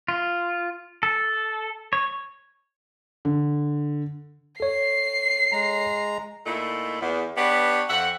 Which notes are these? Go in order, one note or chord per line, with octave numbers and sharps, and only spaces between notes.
F4
A4
C#5
D3
A4 C#5 C7
G#3 A#5
A#2 A3 D#4 E4
E2
B3 D4 G4 B4 C#5
F2 E5 F#5